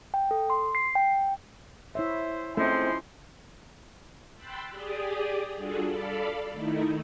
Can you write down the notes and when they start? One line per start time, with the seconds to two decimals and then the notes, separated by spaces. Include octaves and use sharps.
0.14 G5
0.31 A4
0.50 C6
0.75 C7
0.95 G5
1.95 E4 C5 C#5 E5
2.57 F3 G#3 A3 C4 C#4 E4 C6
4.37 G5 B5 C6 E6 F#6 A6
4.71 G4 G#4 D5 D#6
5.56 G3 D4 F4 F#4 G#4 A4
5.86 A4 D5 F5 B5
6.51 D#3 A3 D#4 E4